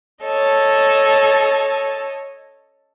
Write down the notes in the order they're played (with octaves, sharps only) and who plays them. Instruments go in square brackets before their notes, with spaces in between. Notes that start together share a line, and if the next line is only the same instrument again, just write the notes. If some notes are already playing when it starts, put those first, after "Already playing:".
[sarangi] A4 [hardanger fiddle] C#5 D#5